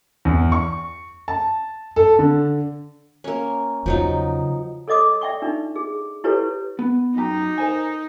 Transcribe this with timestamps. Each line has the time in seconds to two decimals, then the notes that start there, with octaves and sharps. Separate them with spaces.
0.25 E2
0.52 C#6
1.28 A5
1.96 A4
2.19 D3
3.24 A#3 C#4
3.86 E2 C#3 F3 F#3 D#4
4.88 A4 C#5 D#5 D6 D#6
5.21 D5 E5 G5 C#6
5.42 D4 D#4
5.75 G#4
6.24 E4 G4 A4 B4 C#5
6.79 B3
7.17 F#2 D#4 G4 A#5
7.58 A#4 C5 G#5